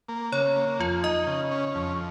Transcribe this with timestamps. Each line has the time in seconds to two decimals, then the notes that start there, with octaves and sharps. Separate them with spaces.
0.09 A#3
0.32 C#3 C#5
0.56 A#3
0.80 F2 F4
1.03 D#4 D#5
1.27 C#3
1.51 C#4
1.75 F2